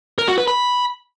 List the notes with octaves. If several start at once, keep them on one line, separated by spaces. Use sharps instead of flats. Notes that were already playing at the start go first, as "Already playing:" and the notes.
A#4
F#4
B4
B5